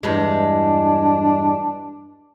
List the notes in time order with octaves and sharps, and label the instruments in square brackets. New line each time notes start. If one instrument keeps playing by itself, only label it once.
[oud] E2 G2 G#3 [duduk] D4